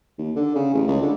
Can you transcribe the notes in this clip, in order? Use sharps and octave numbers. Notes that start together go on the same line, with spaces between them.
D#2
D3
C#3
A1
C#2
D3